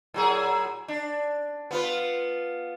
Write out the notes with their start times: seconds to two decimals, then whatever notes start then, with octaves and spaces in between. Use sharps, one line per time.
0.14 A2 F#3 G#4
0.88 D4
1.71 B3 F4 B4